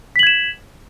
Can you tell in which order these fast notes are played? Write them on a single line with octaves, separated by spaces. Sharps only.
B6 F#7 G#6 E7